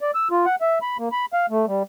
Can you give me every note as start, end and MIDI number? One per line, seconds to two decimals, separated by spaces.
0.01 0.11 74
0.15 0.28 88
0.31 0.45 65
0.46 0.55 78
0.61 0.79 76
0.82 0.97 83
0.99 1.09 58
1.12 1.25 83
1.33 1.46 77
1.50 1.66 57
1.67 1.83 55